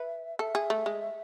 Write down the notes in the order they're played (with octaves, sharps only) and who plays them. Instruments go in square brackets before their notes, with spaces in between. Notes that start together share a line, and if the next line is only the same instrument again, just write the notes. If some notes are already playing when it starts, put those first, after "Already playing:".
Already playing: [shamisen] B4 [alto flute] E5
[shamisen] A4 [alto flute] E5
[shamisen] G#4
A3
G#3